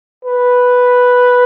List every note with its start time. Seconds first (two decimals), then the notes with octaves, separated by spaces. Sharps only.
0.25 B4